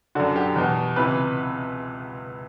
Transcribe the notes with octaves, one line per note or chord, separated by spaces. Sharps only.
F#2 D3 F#4
G4
E2 B2
C#2 C3 E3 B4